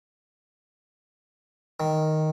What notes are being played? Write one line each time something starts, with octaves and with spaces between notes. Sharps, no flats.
D#3